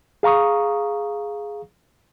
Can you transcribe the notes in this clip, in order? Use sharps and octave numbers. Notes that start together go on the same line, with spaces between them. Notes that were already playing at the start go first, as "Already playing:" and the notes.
G#4 F5 A#5 C#6 D#6